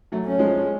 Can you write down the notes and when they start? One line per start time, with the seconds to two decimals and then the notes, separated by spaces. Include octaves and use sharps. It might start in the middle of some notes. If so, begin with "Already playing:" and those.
0.12 F#3 A3
0.25 C#4
0.39 F3 G#3